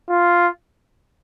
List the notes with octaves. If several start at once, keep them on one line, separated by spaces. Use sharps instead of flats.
F4